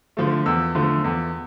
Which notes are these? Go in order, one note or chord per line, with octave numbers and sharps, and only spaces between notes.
D3 F3 A3
E2 E6
D3 F3 A3
E2